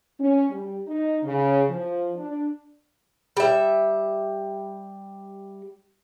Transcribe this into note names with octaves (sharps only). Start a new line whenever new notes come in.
C#4
G3
D#4
C#3
F3
D4
G3 E5